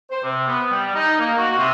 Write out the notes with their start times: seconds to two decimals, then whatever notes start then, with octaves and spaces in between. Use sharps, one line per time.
0.11 C5
0.22 C3
0.46 B3
0.70 G3
0.94 D#4
1.18 A#3
1.37 F#4
1.57 C3